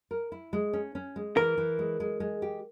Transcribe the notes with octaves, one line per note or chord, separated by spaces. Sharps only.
A#4
E4
G#3
C#4
C#4
G#3
E3 A#4
E3
G#3
G#3
G#3
G4